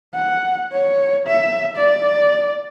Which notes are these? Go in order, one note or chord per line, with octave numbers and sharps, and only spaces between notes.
F#5
C#5
E5
D5